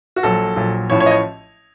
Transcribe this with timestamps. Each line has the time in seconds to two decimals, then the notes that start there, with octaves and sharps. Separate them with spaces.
0.16 F#4
0.23 A#1 A#2 F#3 A4
0.56 A#1 A#2 F#3
0.90 A1 A2 F3 C#5
1.00 C#5
1.06 D#5
1.11 C#5